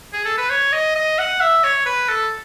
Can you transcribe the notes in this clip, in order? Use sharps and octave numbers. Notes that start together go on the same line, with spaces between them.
G#4
A4
B4
C#5
D#5
D#5
F#5
E5
C#5
B4
A4